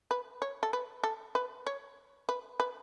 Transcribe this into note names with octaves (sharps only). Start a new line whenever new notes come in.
B4
C#5
A4
B4
A4
B4
C#5
B4
B4